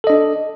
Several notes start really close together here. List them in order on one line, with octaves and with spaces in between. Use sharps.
A4 D#5 D4